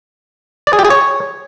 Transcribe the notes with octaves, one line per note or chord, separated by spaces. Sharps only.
D5
G#4
G4
G#4
C#5